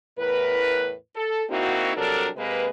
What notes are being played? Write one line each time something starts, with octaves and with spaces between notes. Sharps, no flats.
E2 A2 A#4 B4
A4
A#3 C4 D#4 E4 F#4
C3 F#3 G3 D4 A4 A#4
C3 G#3 A#3 B4